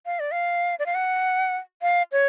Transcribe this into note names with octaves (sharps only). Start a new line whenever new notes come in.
F5
D5
F5
D5
F5
F#5
F5
C#5